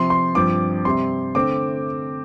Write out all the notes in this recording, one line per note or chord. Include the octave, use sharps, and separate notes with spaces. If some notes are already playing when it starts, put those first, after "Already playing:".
Already playing: C3 F3 C4 C6
C6
G2 F3 C4 D6
C3 G3 C4 C6
D3 A3 C4 D6